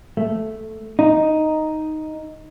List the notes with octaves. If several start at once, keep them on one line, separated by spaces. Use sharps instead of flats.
A3
D#4